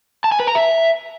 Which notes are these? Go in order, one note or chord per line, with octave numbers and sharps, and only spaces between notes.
A5
G#5
B4
A#5
E5